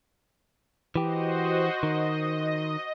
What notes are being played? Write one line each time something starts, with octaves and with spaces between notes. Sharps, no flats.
E3 F#4 G4 C5 D#5
D#3 D#5